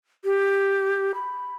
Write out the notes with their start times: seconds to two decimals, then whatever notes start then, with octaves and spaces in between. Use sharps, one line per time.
0.24 G4
1.15 B5